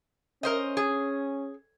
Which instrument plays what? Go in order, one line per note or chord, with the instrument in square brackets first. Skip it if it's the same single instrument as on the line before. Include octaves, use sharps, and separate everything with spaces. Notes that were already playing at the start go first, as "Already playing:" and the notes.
[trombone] C#4 [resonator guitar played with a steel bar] A#4 C5 D#5
[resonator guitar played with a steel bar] G#4